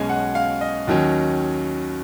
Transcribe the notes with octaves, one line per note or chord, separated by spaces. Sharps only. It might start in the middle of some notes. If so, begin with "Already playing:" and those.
Already playing: B1 B2 G#3 C#4 G#5
F#5
F5
D#5
D#2 D#3 F#3 C#4